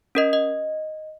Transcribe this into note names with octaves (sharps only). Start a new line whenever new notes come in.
C#4 A#4 D#5
D#5